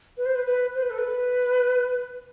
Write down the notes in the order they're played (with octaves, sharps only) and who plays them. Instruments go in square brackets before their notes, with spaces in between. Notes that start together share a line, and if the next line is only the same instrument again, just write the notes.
[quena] B4
C5
B4
B4
C5
B4
A4
B4